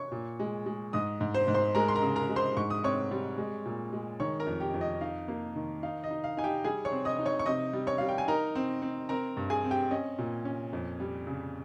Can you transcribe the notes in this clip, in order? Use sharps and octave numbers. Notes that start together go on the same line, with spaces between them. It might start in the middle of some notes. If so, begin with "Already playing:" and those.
Already playing: C#5 C#6
A#2
G#3
G#3
G#2 D#5 D#6
G#2
C5 C6
G#2
C5 C6
G#3 A#4 A#5
C6
A#4 A#5
C#3
A#4 A#5
G#3
C5 C6
G#2 C#6
D#6
C4 C#5 C#6
G3
G#3
A#2
G#3
D#3 C#5 C#6
A#4 A#5
F2
G4 G5
F2
D#5
D#4 F5
A#3
D#3
D#4 F5
D#5
D#4
F5
D#4 G#5
G4 G5
G3 G#4 G#5
C#5 C#6
C4
D#5 D#6
D#4
C#5 C#6
C#6
C3 D#5 D#6
G3
C#5 C#6
G3 F5
G5
G#5
D#4 A#4 A#5
C4
C4
C4 A#4 A#5
G2
G#4 G#5
C4
G4 G5
C#4 D#5
A#2
C#4
F2
G3
C#3